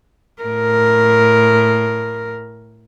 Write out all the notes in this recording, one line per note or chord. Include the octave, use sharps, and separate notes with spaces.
A2 A#4